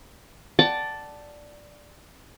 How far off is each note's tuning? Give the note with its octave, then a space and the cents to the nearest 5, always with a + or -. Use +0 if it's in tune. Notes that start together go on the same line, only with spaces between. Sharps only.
D5 +0 F#5 +40 A5 +0